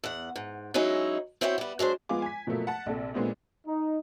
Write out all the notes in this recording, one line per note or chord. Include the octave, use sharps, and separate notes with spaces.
E2 F#5
G#2
F#3 G#3 C#4 D#4 E4
C4 E4 F#4 C#5 D5 G5
G3 B3
F#3 G#3 D4 C5
F3 G#3 B3 F4 G#5 D6
G#5 B6
B2 F3 F#3 A3 A#3
F#5 A5
A#1 C3 A4
A#2 G#3 A3 B3 C4 D4
D#4